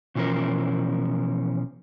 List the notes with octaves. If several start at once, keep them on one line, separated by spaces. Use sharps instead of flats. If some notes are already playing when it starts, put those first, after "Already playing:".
B2 E3 F3 C#4 A#4